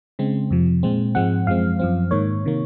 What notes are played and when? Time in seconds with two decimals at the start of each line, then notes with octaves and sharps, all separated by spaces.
0.19 C#3 G#3 C4
0.51 F2 C3 F3
0.83 A#2 G#3 C4
1.15 G#2 F3 G#3 C4 F#5
1.47 F#2 F3 G#3 C4 F5
1.79 F#2 F3 C4
2.11 G#2 D#3 A#3 C#5
2.45 C3 D#3 A#3